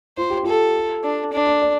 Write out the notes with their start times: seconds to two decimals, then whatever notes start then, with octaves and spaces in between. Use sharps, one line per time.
0.17 F4 C5
0.30 G4
0.43 F4 A4
1.04 D4
1.33 D4
1.47 D5
1.62 D5